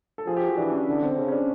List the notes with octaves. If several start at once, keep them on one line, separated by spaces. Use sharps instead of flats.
A4
F3 G#4
G4
F#4
E3 D4
C#4
D3
C4
C#3 C#4
C#4
D4